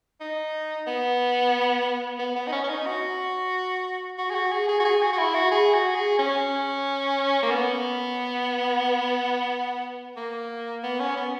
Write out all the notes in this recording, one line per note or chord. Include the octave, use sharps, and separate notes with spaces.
D#4
B3
B3
B3
D#4
C#4
C#4
D#4
F#4
F#4
G#4
F#4
G#4
G#4
F#4
G#4
F#4
F#4
E4
F#4
G#4
F#4
G#4
C#4
A#3
B3
A#3
B3
C#4
B3